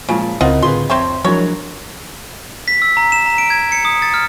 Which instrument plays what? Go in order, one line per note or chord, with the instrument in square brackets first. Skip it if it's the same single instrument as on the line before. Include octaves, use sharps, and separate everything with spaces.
[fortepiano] A#2 F3 [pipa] C#3 [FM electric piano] G#3
[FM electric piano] C#2 C#3 C4 [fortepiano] E4 A#4 [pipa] F4 D#5 F#5
[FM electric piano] A2 D3 C4 [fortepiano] F4 G#4 B4 [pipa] C6
[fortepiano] F2 [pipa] C4 C5 C#5 [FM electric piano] E5 G5
[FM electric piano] F3 D4 A#4 [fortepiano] F#3 G#3 E4 [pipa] C#5
[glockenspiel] B6
E6
A#5
E7
A#5
D7
G#6
C#7
D#6
A6
F6